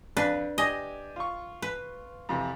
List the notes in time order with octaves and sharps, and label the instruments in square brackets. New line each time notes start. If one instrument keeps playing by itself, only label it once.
[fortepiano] F2 [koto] D4 B4
[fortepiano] D4 G4 G#5 [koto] D#5
[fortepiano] F4 C#6
[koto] B4
[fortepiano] F2 C3 E3